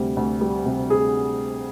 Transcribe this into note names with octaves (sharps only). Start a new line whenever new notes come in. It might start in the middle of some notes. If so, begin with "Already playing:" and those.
Already playing: D2 C3 G3
D2
G3
C3
G#4